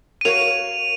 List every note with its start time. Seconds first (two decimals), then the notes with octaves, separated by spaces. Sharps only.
0.21 D#7
0.25 F#4 A#4 C#5 F5 F7